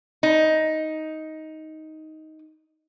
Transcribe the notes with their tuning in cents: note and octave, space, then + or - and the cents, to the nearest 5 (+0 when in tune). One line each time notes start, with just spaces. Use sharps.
D#4 +10